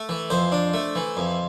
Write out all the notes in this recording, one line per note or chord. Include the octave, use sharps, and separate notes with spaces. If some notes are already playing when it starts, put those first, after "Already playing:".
Already playing: A3
E3
F2 C5
D4
A3
E3
F2